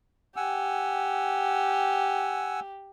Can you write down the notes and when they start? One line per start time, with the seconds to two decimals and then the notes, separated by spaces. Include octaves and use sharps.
0.36 G4 F#5 G#5 E6